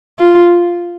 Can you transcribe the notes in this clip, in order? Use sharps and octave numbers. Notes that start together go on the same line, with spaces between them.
F4